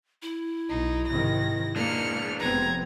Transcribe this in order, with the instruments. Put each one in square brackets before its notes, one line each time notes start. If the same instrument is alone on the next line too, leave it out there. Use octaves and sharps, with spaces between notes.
[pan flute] E4
[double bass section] B1 [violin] D#4
[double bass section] G#2 C3 D#3 [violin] A#6
[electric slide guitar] G#3 D4 [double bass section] A#3 [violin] F6 C#7
[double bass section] F1 B3 C4 [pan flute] B4 [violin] A#5 G#6